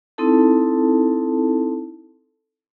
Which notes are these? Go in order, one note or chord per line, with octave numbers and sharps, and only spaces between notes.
C4 D#4 E4 A4 A5